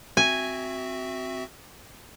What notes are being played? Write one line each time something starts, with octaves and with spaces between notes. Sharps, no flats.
C4 F#4 E5 G#5